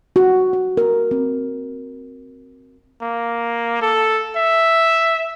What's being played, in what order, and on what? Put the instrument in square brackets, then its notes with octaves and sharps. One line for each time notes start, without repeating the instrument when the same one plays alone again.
[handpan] F#4
F#4
A#4
C4
[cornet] A#3
A4
E5